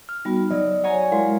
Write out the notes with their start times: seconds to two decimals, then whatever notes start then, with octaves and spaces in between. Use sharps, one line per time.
0.09 F6
0.25 G3 B3 D#4 F#4
0.51 F#3 D5 D#5
0.84 C#5 F#5 G#5 A#5
1.12 G#3 E4 A#4 F5 C6